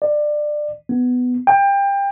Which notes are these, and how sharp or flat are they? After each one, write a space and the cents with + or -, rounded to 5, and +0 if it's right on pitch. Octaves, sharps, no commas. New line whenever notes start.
D5 +20
B3 +10
G5 +25